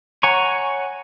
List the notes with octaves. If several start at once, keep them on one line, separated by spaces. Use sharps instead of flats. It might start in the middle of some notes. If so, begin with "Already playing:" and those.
C#5 F#5 G#5 A#5 C#6